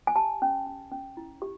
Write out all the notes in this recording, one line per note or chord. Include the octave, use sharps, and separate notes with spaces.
G#5
G4 A5
C#4
C#4
C#4
E4
G4